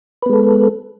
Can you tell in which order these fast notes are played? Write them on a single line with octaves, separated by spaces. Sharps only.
B4 B3 G#3 A4